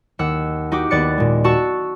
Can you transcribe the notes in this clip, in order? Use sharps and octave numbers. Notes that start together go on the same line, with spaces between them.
D#2 F#5 E6
D#4 F#4 G4 D6
D#2 B3 D5 F#6 A6 C#7
A#2 G#3
F#4 A5 C#6 E6